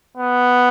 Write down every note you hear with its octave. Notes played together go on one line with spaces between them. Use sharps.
B3